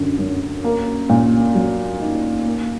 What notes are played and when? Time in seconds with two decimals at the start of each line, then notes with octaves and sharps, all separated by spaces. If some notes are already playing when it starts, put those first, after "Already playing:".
Already playing: F#2 D3
0.19 F#2
0.64 A#3
1.10 A#2
1.55 F#3
2.00 D#4
2.46 A#3